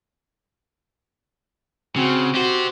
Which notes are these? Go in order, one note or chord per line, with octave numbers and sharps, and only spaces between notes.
C#3 C4 F#4
F#4 G4 C5